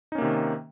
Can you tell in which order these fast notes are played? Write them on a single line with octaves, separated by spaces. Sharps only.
D#4 C#4 A#3 C3 D#3